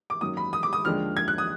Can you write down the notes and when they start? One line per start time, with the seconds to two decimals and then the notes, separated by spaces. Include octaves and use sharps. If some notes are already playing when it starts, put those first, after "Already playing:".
0.10 D6
0.21 F#2 D#3 F#3 A#3 D#6
0.37 B5
0.53 D#6
0.63 D6
0.73 D#6
0.85 D#2 D3 F3 G#3 D4 F6
1.17 G#6
1.28 F#6
1.38 D#6